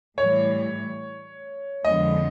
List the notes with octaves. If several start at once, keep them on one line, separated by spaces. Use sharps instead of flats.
A2 E3 G3 C#5
F2 D3 F3 G#3 B3 D#5